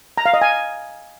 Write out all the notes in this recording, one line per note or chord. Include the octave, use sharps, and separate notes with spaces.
A#5
F5
D#5
G#5